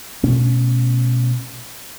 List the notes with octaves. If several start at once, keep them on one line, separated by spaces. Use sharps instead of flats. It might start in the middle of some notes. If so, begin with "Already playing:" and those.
B2 A3 C#4